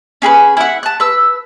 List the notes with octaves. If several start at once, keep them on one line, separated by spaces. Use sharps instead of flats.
C#4 G#4 A4 B4
E4 F#5
A5 F#6
B4 E6